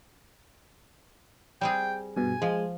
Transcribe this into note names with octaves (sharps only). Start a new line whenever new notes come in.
G3 C4 G#4 G5
G2 B2 G#5
F3 G#3